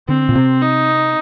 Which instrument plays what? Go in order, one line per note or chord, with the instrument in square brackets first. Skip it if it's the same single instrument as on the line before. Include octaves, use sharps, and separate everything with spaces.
[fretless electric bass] D3 [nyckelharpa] C4
[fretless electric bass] A#2
C3
[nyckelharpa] D#4